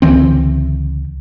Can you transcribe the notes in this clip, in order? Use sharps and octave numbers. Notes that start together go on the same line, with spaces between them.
C#2 D3 E3 C4